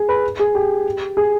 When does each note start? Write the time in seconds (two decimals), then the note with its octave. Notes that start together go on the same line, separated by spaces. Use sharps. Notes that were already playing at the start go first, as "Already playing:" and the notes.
Already playing: G#4
0.09 B4
0.40 G#4
0.55 G4
1.17 G#4